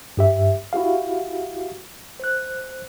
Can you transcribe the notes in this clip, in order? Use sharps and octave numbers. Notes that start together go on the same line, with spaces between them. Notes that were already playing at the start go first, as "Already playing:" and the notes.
G2 G4 E5
E4 F#4 G4 F5
C5 F#6